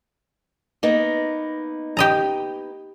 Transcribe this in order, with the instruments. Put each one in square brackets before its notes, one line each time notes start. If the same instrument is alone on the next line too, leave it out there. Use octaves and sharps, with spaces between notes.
[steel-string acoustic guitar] A#3 B3 D#4
[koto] G4 D#5 A#5